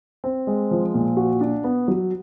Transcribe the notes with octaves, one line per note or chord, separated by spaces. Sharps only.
C4
G#3
F3
A#2
F#4
D4
B3
F#3